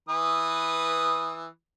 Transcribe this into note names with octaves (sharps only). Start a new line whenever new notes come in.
E3 B4 D#6